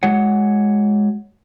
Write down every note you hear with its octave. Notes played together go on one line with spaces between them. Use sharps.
G#3 F#4 C#5 F#5